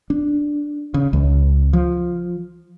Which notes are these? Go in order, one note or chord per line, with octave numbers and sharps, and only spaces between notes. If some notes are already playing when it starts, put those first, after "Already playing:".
D4
C#3
C#2
F3